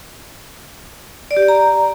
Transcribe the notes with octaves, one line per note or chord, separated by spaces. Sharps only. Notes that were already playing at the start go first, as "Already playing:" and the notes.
D5
G4
D5
A#5